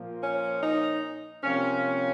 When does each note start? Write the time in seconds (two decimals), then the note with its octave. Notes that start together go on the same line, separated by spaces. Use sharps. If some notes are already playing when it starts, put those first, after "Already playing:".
Already playing: A#2 F3 A#3
0.22 C#4
0.62 D#4
1.43 C3 F3 A#3 C#4